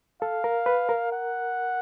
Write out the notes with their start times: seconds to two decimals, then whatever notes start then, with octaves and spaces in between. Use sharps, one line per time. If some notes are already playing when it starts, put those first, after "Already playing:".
0.21 A4 F5
0.44 A#4
0.66 B4
0.89 A#4
1.12 F#5